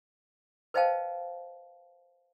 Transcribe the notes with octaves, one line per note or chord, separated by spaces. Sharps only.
B4 C5 D#5 F5 G5 A5